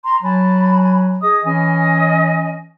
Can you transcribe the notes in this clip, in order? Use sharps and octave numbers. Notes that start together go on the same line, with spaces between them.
A#5 C6
F#3 G#5 A5 B5
G#4 D#5 D#6
E3 C#4 D#5 G#5